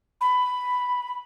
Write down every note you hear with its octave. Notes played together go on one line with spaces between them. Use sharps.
B5